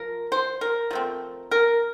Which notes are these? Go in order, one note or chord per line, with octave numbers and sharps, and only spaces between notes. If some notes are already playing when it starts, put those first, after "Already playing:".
Already playing: F3 A#4
C5
A#4
F3 A3 C4
A#4